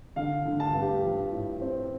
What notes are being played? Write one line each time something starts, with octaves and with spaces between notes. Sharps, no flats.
D3 F5
D3
A5
G2
G4
F3
A2
C4